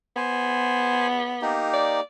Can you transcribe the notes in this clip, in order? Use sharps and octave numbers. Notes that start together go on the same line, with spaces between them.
B3 C5 G#5
A#3 D#4 G4
D5